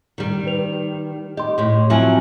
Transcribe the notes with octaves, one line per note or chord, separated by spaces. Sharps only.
D#3 G3
D#4 B4 F7
G4 D#5 C6
A2 G4
F3 F#3 C4 E5 G#5 F#7